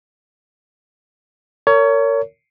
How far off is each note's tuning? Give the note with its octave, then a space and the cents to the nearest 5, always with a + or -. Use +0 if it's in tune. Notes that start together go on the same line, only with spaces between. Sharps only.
A#4 -30 C#5 +25